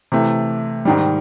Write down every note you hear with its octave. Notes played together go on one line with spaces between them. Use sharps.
C3 E3 A3
G#2 D#3 G3